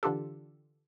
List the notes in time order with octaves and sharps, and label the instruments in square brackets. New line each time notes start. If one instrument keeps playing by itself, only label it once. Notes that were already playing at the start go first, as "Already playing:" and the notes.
[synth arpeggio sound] D3 E3 D4 F4 G4 A4